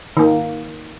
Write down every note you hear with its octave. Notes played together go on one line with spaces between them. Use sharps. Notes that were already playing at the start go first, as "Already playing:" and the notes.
D#3 A#3